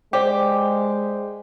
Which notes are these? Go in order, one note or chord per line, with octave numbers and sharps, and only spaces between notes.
G#3 G4 C5 D5